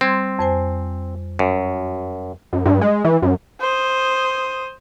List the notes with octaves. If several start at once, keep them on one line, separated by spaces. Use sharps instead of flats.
G3 C4 C6 G#6
F2 C5 G#5
F#2
F#2
G2
G#3
E3
F#2
C5 D#6